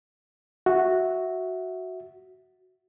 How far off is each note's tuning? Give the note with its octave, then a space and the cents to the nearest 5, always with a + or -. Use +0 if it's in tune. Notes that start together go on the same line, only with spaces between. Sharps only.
F#4 +0 E5 -10